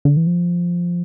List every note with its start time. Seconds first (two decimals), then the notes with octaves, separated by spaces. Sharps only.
0.05 D3
0.17 E3
0.27 F3